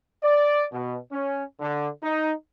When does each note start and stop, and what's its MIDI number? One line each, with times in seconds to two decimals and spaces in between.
0.24 0.65 74
0.72 0.97 47
1.12 1.43 61
1.60 1.89 50
2.02 2.33 63